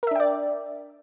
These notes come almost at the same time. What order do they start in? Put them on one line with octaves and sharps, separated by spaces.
A#4 E5 D4 G5 D5